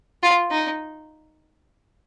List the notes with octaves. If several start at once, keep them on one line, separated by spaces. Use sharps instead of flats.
F4
D#4